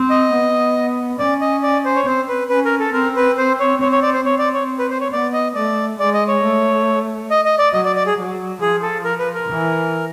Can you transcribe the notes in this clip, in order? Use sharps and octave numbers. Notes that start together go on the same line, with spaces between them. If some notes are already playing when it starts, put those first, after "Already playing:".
Already playing: C4
D#5
B3
C#4 D5
D#5
D5
C5
C#5
C4 C5
B4
C#4 B4
A#4
A4
C4 A#4
B4
C5
C#5
C4 C#5
C#5
D5
C5
C4 C#5
D5
C#5
B4
C5
C#5
B3 D5
D#5
A3 D5
G#3 D5
D#5
C#5
A3
D#5
D#5
D5
F#3 D#5
D5
D5
G#4
F#3
F3 G#4
A4
A#4
B4
A#4
E3